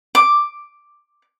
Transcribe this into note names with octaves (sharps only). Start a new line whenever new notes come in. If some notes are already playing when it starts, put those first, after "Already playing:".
D6